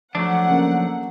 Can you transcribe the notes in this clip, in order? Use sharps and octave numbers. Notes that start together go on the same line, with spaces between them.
F3 F#3 A3 D4 F#5
C#3 A#3